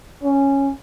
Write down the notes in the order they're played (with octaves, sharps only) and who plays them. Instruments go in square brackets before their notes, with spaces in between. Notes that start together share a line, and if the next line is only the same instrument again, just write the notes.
[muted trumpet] C#4